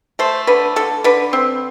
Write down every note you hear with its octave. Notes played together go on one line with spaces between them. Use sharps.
A3 C5
D3 B4
D3 A4
D3 B4
C4